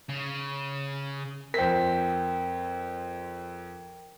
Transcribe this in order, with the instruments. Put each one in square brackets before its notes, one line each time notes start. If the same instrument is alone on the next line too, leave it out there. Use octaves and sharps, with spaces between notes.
[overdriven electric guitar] C#3
[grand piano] F2 C5 B6 [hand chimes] A#4 G5